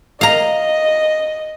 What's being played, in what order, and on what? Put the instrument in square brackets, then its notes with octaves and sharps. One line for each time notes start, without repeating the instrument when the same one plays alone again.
[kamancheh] D#5 [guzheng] F5 A#5